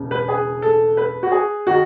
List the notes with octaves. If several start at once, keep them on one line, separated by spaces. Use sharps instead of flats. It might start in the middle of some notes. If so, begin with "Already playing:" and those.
Already playing: E1 C#3
B4
G#4
A4
B4
F#4
G#4
D#3 F#4